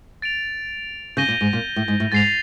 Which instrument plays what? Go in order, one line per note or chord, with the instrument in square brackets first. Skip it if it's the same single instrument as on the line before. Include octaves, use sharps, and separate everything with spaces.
[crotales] A6 D7 F7
[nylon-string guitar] C#3 [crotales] G6 A#6 D#7 G7
[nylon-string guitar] A#2
G#2
A#2
A2
G#2
A2
[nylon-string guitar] G#2 [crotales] A6 C7 F7